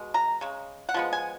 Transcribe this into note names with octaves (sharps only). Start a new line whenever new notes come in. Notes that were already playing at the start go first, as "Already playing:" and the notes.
Already playing: B2 G#3
A#5
C#3 G#3
F#5
F3 G#3 B3
G#5